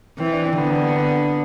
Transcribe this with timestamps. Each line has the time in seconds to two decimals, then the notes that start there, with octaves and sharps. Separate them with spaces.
0.19 E3 C4
0.33 D4
0.45 C4
0.58 D3 B3
0.70 B3
0.83 B3
0.96 B3